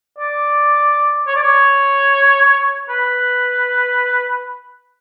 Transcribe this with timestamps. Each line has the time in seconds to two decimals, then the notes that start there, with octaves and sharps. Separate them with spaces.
0.19 D5
1.27 C#5
1.36 D5
1.43 C#5
2.90 B4